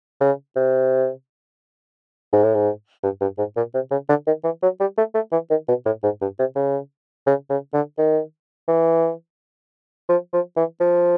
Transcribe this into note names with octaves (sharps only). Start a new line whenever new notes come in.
C#3
C3
G#2
A2
G#2
G2
G2
G#2
A#2
C3
C#3
D3
D#3
E3
F#3
G3
A3
A3
E3
D#3
B2
A2
G#2
G2
C3
C#3
C#3
C#3
D3
D#3
E3
F3
F3
E3
F3